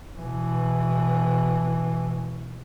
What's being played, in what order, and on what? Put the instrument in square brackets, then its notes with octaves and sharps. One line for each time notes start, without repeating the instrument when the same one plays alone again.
[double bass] B2 E3